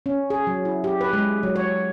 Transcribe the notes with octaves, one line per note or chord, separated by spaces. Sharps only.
C#4
G#4
F#3
E4
G4
B4
G#3
F#3
C#5